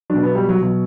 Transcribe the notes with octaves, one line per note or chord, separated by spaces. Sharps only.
B2 F#3 D4
B3
G3
F#3
B2 F#3